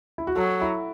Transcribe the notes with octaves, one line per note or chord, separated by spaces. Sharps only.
E4
F#4
F#3 A4
E4